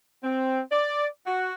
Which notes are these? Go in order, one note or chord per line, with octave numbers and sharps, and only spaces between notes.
C4
D5
F#4